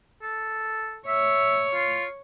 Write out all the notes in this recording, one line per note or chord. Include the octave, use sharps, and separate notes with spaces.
A4
C#5 E5
F4